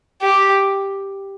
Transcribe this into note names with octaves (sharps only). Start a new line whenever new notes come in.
G4